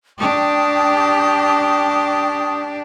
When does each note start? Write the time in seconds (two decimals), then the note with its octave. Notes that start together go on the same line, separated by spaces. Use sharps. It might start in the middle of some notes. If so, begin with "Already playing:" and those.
0.18 D4 G4 G5 C#6 D#6